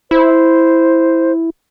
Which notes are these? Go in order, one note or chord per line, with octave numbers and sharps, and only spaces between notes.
E4 C5